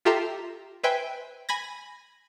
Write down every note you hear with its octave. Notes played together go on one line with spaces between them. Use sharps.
F4 G4 A4 E5 A#5 C6
B4 C5 E5 G5 G#5
G#5 B5 G#6 A#6